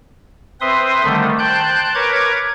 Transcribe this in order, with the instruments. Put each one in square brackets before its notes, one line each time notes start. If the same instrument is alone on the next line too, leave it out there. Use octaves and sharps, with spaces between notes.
[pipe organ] C4 B4 C5 E5 C6 D#6
D3 D#3 G3 A3
C5 G5 A5 F#6 G6
A#4 B4 C#5 A#5 D6 G#6